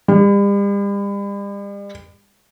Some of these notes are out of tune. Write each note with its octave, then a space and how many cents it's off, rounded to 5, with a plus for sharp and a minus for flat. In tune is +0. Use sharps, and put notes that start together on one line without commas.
G3 +40